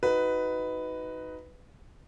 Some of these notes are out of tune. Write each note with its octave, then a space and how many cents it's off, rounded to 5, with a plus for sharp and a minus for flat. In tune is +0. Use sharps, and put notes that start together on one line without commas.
D#4 +20 F#4 +0 B4 +10